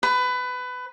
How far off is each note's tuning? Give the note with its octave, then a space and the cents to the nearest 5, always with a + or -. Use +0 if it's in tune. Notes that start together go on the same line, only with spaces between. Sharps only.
B4 +20